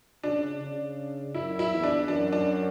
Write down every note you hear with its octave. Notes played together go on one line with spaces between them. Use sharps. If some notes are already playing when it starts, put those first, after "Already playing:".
C#3 D4
C#3
F#2 E4
E4
E2
D4
F#2 D4
D4